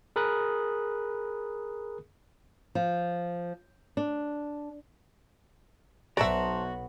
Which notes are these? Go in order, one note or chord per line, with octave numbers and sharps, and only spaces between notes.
G#4 A#4 B5 D#6 F#6
F3
D4
B1 B3 F#4 C5 D5 E5 A5 A#5